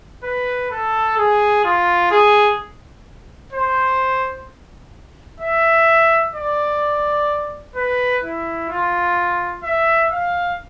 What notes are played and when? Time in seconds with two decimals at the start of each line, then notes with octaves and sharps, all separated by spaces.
0.23 B4
0.71 A4
1.17 G#4
1.64 F4
2.11 G#4
3.52 C5
5.40 E5
6.34 D5
7.76 B4
8.23 E4
8.69 F4
9.63 E5
10.10 F5